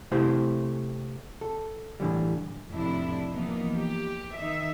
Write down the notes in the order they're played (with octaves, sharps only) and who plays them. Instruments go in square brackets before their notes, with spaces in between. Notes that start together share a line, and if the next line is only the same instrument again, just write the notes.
[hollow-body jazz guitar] C3 A3 E4 G4 C5
A4
A2 D3 E3 G3
[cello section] F2 A2 C3 D4 E4
E3 F3 A#3 B3 D#4
G4
D#3 D#4 E5